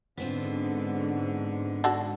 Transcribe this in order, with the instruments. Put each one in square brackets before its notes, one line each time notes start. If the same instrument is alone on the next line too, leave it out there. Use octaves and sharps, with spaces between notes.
[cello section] G#2 D3 [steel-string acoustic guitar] B3 C4 F4
[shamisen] D4 F#4 A4